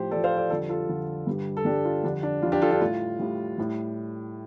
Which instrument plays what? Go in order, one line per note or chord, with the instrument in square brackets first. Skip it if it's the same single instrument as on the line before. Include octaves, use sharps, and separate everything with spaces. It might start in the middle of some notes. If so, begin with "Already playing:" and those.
Already playing: [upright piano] A2 F3 G4 C5
A2 A4 D5
F3
C5 F5
A4 D5
F2 D3 G3 A4 D5
F4 A4
F2 D3 G3
G2 D3 G3
A4
G2 D3 G3 D4 G4
F4
F2 D3 G3 D4
D4
F2 D3 G3 F4
D4 G4
F4 A4
D4 G4
A2 G3 F4
A2 G3
A2 G3